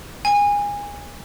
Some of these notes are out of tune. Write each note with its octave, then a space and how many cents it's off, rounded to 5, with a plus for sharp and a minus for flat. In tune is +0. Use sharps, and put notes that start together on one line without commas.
G#5 -25